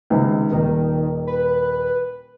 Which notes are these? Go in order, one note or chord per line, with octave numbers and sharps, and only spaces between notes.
C#2 C3 D#3 G#3
D#1 D#3
B4